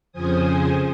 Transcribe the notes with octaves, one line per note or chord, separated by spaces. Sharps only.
F2 C#3 F3 C5 G#5 D#6